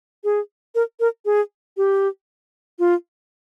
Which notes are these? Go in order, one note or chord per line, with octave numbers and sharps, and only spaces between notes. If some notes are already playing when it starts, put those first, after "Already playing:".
G#4
A#4
A#4
G#4
G4
F4